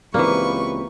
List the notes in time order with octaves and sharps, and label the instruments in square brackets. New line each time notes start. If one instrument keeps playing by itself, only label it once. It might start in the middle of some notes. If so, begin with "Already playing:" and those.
[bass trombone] C#2 [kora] E3 A#3 [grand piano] C4 G4 D5 [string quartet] B4 C#6